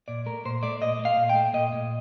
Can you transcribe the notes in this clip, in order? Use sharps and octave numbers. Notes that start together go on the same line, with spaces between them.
A#2 D5
A3 A#4
A#2 C5
A3 D5
A#2 D#5
A3
F5
A#2
G5
A3
A#2 D#5
A#2